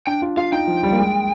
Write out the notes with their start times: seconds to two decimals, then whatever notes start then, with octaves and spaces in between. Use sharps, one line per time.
0.07 D4 G5
0.22 F4
0.37 F4 F5
0.52 D#4 G5
0.67 F3
0.83 G3
0.92 A#3
0.98 G#3